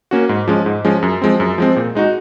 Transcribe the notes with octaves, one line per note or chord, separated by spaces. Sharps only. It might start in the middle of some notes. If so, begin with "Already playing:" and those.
A#3 C#4 F#4
G#2
F3 G#3 C#4
G#2
F3 G#3 C#4
F#2
F3 G#3 C4
F#2
F3 G#3 C4
A#2
G#3 D#4 F#4